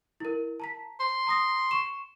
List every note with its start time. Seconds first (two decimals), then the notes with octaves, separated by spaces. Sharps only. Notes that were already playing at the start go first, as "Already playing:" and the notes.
0.20 E4 A#4
0.60 A5 A#5 B6
1.00 C6
1.27 A#5 D#6 A#6
1.71 C#6 E7